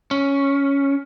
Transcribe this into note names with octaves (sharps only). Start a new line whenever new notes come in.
C#4